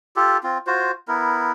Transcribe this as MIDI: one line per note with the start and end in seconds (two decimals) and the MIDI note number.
0.16 0.37 65
0.16 0.37 67
0.16 0.37 69
0.43 0.58 60
0.43 0.58 65
0.67 0.91 65
0.67 0.91 66
0.67 0.91 72
1.08 1.52 59
1.08 1.52 64
1.08 1.52 70